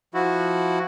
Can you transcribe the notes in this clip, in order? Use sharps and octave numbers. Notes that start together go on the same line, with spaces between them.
F3 E4 F#4